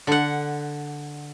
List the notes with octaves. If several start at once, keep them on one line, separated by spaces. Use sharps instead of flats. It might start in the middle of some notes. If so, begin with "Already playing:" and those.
D3 F#5